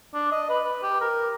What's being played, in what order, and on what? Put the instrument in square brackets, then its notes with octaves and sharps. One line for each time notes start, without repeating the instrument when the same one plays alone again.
[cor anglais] D4
D#5
B4
B4
G4
A#4